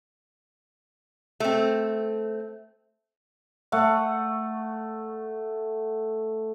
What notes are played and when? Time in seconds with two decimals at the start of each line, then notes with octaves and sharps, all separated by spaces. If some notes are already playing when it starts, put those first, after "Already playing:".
1.40 A3 C4
3.72 A3 F#5